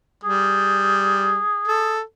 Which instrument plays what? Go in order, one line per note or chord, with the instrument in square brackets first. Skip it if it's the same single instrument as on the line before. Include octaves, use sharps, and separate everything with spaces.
[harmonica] G3 [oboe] G#4
[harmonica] A4